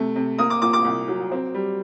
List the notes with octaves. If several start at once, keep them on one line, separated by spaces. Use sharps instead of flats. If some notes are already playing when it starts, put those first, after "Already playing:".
Already playing: C3 A3
C3
A#3 D#6
D6
A#2 D6
D6
C2
F#3
C4
G3